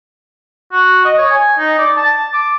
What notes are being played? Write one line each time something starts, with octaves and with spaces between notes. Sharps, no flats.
F#4
D#5
C#5
G#5
D#4
D5
A5
D6